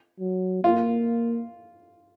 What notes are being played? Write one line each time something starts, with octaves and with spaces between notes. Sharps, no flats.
F#3
A#3 F4